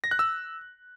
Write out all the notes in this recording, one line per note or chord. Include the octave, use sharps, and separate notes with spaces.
A#6
F#6
E6